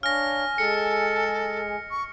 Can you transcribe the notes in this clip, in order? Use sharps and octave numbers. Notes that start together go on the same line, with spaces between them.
D4 C#5 F5 G#5 F6 A#6
G#3 G#4 A4 C#7
C#6